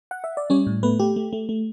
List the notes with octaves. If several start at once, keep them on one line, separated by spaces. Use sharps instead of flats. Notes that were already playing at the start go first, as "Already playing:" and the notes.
F#5
E5
D5
G3 C#4 C#5
A2
A3 B3 B4
A3 G4
A3
A3
A3